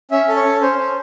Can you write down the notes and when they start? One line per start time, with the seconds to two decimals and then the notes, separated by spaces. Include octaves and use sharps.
0.11 C#4 E5
0.28 A4
0.36 C#5
0.44 C#4
0.61 C#4 C5
0.78 C#4